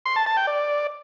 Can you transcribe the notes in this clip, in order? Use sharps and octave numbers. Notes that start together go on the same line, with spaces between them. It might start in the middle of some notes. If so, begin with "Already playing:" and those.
C6
A5
A5
G5
D5